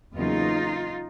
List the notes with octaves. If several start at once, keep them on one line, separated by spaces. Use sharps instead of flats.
E2 C#3 F#3 A#3 D#4 F4